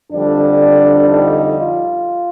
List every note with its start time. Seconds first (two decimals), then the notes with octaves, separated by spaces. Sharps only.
0.12 F2 D3 G3 D4
1.11 D#4
1.60 F4